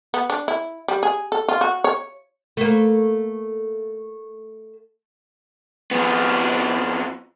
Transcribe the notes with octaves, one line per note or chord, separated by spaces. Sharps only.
B3
D4
E4
G3
G#4
A4
F4
F#4
C#5
A3 A#3
F2 B3